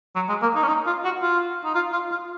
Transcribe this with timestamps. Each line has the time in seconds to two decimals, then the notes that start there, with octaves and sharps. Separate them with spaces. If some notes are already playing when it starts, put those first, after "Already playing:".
0.15 F#3
0.29 G#3
0.42 A#3
0.55 D#4
0.63 C#4
0.68 D#4
0.87 F4
1.04 F#4
1.22 F4
1.65 D#4
1.75 F4
1.93 F4
2.11 F4